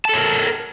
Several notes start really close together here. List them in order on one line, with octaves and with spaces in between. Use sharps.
A5 A4 C#5 A#4